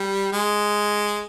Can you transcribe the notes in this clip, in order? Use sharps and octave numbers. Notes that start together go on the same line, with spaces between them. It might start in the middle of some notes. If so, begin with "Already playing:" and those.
Already playing: G3
G#3